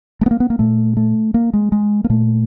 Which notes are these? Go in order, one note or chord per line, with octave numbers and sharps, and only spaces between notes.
A3
B3
A#3
B3
A#3
A#2 A3
A3
A#3
G#3
G#3
A#3
A#2 A3